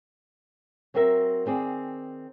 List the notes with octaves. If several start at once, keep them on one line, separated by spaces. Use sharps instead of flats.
F#3 C4 F#4 A#4 E5
D#3 C4 G#4 D5